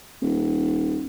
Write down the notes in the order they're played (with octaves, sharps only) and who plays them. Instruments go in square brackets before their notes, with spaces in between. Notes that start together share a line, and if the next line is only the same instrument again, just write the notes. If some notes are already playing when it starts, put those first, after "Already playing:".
[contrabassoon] D#1